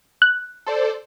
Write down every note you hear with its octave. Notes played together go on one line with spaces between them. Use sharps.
F#6
A4 C5 D5